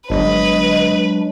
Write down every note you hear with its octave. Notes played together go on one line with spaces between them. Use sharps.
G1 F#3 G#3 D4 B4 D#5